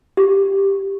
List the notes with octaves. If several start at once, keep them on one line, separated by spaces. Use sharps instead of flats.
G4